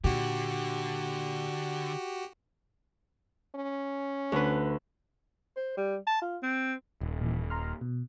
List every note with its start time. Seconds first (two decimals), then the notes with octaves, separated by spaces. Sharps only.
0.04 A#2 D3 F#4 G4
3.55 C#4
4.32 D2 B4
5.57 C5
5.77 G3
6.07 A5
6.22 F4
6.43 C4
7.01 D#1
7.21 A#2 E3
7.50 A#5 C6 F6
7.81 B2